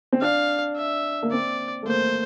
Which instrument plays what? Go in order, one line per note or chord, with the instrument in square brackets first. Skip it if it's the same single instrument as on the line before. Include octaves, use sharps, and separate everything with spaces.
[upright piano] C4
[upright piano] D4 [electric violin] F5
[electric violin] E5
[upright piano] A#3
[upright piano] C4 [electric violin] D5
[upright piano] A3
[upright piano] A#3 [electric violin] C5